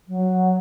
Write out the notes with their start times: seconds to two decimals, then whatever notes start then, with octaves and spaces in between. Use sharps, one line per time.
0.08 F#3